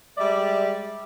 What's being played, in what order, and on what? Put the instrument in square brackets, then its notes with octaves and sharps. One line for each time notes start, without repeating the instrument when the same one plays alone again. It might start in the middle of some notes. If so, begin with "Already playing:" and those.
[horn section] G3 G#3 D5 E5